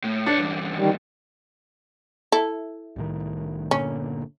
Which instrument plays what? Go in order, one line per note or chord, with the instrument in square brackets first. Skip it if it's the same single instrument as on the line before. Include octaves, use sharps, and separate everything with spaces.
[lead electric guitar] A2
[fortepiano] D4 [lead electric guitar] B4 C#5
[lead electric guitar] E2 G2
[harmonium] D#3 G3
[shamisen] E4 A4
[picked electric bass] C2 A2 D#3
[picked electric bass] G1 A#2 D3 [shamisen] C#4